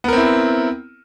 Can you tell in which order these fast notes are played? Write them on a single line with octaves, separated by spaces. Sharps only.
B3 A#4 C4 E4